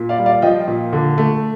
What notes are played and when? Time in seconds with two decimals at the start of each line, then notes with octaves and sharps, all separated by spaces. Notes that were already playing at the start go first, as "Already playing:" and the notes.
Already playing: A#2
0.09 D5 F5
0.18 G3
0.26 D5 F5
0.42 F3 D#5 G5
0.68 A#2
0.93 D3
1.18 A3